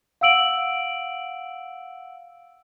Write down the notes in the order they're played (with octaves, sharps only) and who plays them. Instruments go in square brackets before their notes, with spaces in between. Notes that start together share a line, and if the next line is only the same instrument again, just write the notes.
[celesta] F5 F#5 E6 D7 F#7